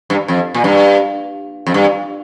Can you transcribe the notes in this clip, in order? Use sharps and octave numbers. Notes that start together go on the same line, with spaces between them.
G2
F2
A#2
G2
F2
G2